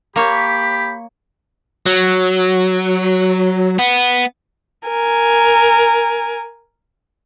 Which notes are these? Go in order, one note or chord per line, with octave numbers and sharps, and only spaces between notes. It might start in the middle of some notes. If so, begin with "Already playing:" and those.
A#3 G4 C#5 B5
F#3
B3
A#4 G#5